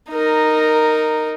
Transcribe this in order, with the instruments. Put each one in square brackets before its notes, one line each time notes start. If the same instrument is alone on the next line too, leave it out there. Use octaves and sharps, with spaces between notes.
[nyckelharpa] D#4 A#4